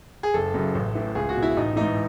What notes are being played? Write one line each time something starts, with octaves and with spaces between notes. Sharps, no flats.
G#4
F#1 A4
F#2 C#3
A1
A2 E3
C#2 G#4
F#4
B2
E4
A1 D#4
G#2 E3 D#4